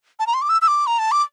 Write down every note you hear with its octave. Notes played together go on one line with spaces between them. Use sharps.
A5
A#5
C6
D6
E6
E6
D6
A#5
A5
D6